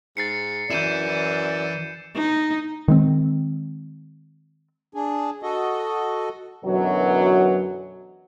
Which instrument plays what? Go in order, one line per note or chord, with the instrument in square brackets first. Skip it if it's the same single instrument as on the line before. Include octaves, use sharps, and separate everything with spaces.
[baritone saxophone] G#2 [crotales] A6 C7 C#7
[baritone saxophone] F#2 [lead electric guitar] E3 E4 [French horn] D5 [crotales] G6 D#7 E7
[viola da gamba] D#4
[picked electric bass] D#3 G#3 C4
[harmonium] D4 G#4
F#4 A4 D#5
[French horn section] F#2 B2 D3 E3 F#3